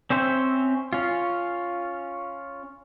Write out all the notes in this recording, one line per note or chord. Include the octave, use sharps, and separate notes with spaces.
C4 C#4 C5 E5
C#4 F4